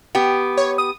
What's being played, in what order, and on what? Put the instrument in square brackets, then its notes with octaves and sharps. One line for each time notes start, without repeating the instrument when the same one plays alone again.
[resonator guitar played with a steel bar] B3 G4
[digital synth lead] C#5
D#6